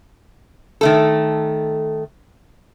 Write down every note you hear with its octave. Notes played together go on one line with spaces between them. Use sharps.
D#3 A3 A4